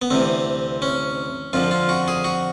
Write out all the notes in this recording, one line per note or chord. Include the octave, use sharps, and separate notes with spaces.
B3
D2 C3 E3 C4
C#4
F2 D3 F3 F4
F4
F#4
G#4
F#4